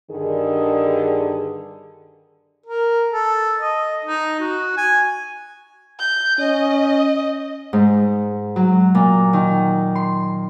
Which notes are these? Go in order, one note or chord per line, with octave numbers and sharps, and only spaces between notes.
G2 D3 D#3 G#4
A#4
A4
D#5
D#4
F#4
G#5
G6
C#4 D#5
G#2
F#3
A#2
D#3
C6